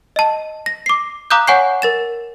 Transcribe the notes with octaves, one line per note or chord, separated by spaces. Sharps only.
D#5 A5
A#6
D6 C7
F5 A#5 D6 D#6 F#6 G6
C#5 F#5 G#5 C#6 G6 C7
A#4 A6 E7